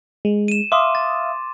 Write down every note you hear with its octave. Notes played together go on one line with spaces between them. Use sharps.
G#3
D#7 E7
E5 F5 C6 D6 D#6
A6